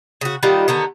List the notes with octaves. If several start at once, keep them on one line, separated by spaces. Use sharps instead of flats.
C#3 F#4
D#3 G3 F4 F#5
D3 D#3 B3